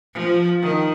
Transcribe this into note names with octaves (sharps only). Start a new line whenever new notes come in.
F3
D#3